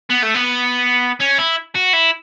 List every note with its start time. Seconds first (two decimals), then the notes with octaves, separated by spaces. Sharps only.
0.10 B3
0.23 A3
0.35 B3
1.20 C#4
1.38 E4
1.75 F#4
1.93 E4